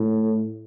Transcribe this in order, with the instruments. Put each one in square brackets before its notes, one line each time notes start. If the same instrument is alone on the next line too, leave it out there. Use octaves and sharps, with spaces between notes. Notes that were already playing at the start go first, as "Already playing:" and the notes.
Already playing: [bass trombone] A2